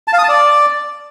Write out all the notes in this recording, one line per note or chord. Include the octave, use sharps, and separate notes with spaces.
A5
F5
D#6
A5
D5